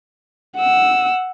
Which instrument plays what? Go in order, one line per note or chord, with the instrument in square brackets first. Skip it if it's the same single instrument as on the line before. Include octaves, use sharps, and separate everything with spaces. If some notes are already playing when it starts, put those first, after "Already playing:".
[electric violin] F#5 E6